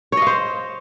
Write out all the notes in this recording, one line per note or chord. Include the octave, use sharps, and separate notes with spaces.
C5 C#5 D#5 F5